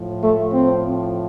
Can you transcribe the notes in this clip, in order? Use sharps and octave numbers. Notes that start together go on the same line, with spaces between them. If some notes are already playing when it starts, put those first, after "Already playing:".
Already playing: A2 F3
A3
C4